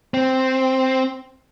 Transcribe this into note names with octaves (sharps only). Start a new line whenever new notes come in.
C4